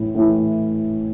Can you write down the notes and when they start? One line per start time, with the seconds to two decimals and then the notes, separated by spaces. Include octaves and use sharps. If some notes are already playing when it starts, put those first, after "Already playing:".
Already playing: A2 E3
0.15 A2 E3